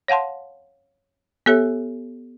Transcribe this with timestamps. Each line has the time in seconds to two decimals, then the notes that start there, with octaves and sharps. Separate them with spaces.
0.08 C#5 F5 F#5 A5 C6
1.46 B3 G4 A4 C#5 E5